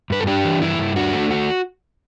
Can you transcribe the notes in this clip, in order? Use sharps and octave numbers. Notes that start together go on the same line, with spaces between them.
G2 B4
A4
D4 G4
E3
G2 E4
G2
D4 F#4
A3
F#4